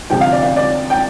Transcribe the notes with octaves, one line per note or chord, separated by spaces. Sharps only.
D2 C3 F3 G5
F5
D5
F5
D5
G5